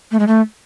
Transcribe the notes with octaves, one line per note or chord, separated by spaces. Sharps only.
A3
G#3
A3